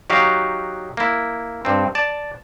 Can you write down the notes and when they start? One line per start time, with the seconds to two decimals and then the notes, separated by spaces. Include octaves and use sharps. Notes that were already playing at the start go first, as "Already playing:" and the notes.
0.10 F#3 D#4 F#4 G4 F5
0.97 A#3 E4
1.65 G2 C4
1.95 D5 A5